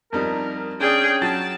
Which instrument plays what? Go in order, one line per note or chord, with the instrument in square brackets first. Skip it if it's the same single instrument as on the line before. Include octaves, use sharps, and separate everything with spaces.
[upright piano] F2 G3 D#4 [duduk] A#4
[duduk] C#4 [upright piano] D4 D5 [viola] G#4 G5
[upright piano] F#3 A6 [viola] A5